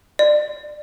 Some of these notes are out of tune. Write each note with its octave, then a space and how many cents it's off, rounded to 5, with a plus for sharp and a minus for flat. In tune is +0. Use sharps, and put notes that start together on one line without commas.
D5 +25